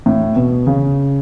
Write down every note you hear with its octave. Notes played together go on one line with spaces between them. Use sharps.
A2
B2
C#3